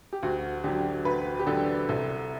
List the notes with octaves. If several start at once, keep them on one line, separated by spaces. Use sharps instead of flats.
G4
D2 F#4
D3 F#3 G4
D2 B4
G4
D3 F#3 A4
C2 A4